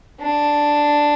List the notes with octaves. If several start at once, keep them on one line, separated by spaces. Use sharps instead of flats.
D4